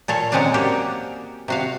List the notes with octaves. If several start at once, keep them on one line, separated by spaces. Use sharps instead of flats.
A#2 A4 C#5 F5
F#3 G#3 C4 C#4 F#4 D5
A#3 F#4 G4 A#4
C3 F#4 F5